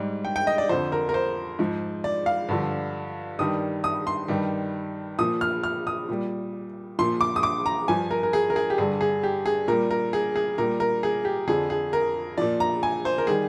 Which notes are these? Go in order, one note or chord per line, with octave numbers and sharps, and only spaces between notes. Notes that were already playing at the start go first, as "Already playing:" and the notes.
Already playing: G#2 G3
G5
G5
D#5
D5
F2 D3 F3 C5
A#4
A#4
C5
G#2 F3
D5
F5
G2 D3 F3
G2 D#3 G3 D#6
D#6
C6
G2 D#3 G3
A#2 F3 D#6
F6
F6
D#6
A#2 G3
A#2 F3 C6
D6
D#6
D6
A#5
G2 F3 G#5
A#4
A#4
G#4
A#4
G#4
G4
G2 D3 G3 G#4
G#4
G4
G#4
A#2 G3 A#4
A#4
G#4
G#4
A#2 G3 A#4
A#4
G#4
G4
F2 D3 F3 G#4
G#4
A#4
A#2 F3 D5
A#5
G#5
C5
A#4
D#3 G3 G#4